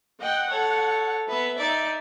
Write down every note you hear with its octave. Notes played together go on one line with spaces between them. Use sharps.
D#5 F#5 G5
A4 C#5
B3 B4 E5
D#4 D5